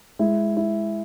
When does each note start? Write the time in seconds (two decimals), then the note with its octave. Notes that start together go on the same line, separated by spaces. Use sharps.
0.19 G#3 E4
0.57 E4